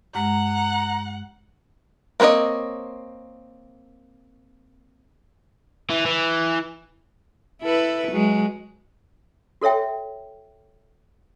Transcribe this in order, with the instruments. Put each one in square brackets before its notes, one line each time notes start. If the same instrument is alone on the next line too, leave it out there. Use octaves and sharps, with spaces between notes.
[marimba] G2 G#3 [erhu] F#5 [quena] A#5
[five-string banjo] A#3 C4 B4 C#5 D#5
[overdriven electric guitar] E3
E3
[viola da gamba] E4 A4 B4
F#3 G#3
[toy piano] F#4 A4 C#5 E5 G5